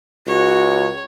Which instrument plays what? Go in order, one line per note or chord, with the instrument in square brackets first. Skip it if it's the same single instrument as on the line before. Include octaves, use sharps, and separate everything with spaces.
[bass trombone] C#2 [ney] F#4 [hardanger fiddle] C#5